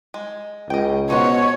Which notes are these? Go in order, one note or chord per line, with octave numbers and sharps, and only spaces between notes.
G#3
C#2 D#5 G5
B2 D#4 C5 C#5 F#5